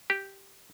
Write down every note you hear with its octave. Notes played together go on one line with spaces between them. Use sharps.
G4